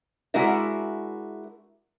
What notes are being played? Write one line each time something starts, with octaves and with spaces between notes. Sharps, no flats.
G#3 D4 E4 F#4 A#4 E5